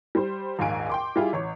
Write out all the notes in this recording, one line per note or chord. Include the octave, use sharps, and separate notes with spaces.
G3 C5
A#1 D#2 G#2 F5 G#5 D7
G5 C6 D6
G3 E4 F4 G#4
A1 C#5